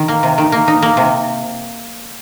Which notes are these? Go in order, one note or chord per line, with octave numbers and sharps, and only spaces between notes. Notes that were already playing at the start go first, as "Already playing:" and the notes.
Already playing: D#3
A#3
C3
D#3
A#3
D#4
A#3
C3